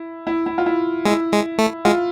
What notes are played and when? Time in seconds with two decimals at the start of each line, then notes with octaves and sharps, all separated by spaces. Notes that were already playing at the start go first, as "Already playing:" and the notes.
Already playing: E4
0.27 E4
0.46 E4
0.58 F4
0.66 E4
1.05 G#3 E4
1.32 G#3
1.58 A3
1.85 G#3 F4